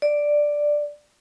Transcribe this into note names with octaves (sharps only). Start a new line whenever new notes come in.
D5